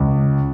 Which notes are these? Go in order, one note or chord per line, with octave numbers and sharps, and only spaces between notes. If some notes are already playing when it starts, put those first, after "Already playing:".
Already playing: C#2